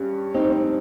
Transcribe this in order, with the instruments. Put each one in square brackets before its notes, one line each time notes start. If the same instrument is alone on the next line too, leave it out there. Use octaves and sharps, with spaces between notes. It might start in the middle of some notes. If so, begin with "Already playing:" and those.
Already playing: [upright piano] G2 C#4
[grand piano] C4 D#4
C4